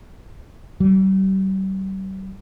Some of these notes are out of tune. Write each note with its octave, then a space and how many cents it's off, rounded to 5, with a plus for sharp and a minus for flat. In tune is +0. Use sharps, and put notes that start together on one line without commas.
G3 -40